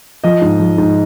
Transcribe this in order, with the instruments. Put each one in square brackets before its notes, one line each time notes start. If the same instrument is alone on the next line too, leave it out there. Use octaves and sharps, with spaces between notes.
[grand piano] F3 D#5
G#2
F3
G#2